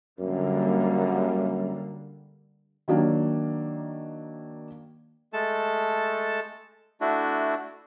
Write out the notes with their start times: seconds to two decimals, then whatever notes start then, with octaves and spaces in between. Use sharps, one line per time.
0.19 F#2 D3 G3 A#3
2.88 D#3 F#3 A#3 D4
5.33 G#3 A3 A4 A5
7.01 A3 D4 E4 F#4